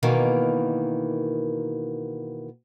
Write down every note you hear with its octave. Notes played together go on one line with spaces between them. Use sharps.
B2 D#3 E3 A#3